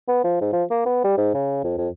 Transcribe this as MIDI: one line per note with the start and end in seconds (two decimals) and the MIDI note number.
0.08 0.23 59
0.24 0.36 53
0.41 0.51 44
0.53 0.64 53
0.71 0.84 58
0.86 1.04 59
1.04 1.14 55
1.17 1.32 44
1.34 1.61 49
1.64 1.75 41
1.78 1.89 41